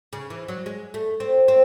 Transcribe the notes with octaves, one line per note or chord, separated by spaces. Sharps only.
C#3
E3
F#3
G#3
A3
C4
C4